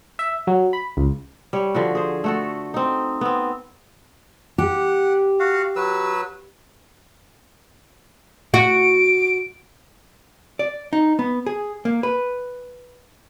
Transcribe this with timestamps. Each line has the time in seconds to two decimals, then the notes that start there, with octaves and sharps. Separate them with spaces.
0.19 E5
0.47 F#3
0.73 B5
0.97 C#2
1.53 G3 C#5
1.74 D3 F3 F#4
1.95 G#4 C5
2.24 A3 F#4 A4
2.74 C4 D#4
3.21 B3 C4
4.58 G4 F#5
5.40 F#4 F5 F#5
5.76 F#3 B4 E6
8.54 F#4 D7
10.59 D5
10.93 D#4
11.19 B3
11.46 G#4
11.85 A#3
12.03 B4